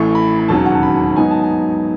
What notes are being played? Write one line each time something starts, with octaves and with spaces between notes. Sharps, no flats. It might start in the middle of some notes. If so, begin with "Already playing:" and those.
Already playing: A1 A2 E3 A3 C#6
B5
B5
E1 D#2 D#3 F#3 C#4 A5
F#5
A5
B5
G#2 F#3 B3 D#4 G#5
A5
G#5